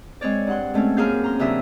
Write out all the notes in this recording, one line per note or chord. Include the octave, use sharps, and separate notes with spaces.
G#3 C4 C#5 D5
G2 F#5 C6
G#3 A3 C4 C#4
F#2 A#3 G#4 F5 G6
A#5 C6
C3 E3 F#3 D4 E5 D#6